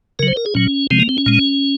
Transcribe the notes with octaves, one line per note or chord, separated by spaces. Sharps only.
C#3 F#3 A#4
C5
A#4
G#4
A#2 F#3 C#4
C3 F3 G#3 C4
A#3
C4
C#4
A#2 G#3